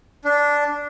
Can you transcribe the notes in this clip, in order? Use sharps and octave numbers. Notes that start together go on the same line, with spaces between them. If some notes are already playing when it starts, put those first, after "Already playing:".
D4